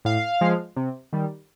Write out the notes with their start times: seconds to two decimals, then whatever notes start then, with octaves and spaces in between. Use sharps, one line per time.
0.05 A2 F5
0.41 F3 G#3
0.76 C3
1.13 D#3 G3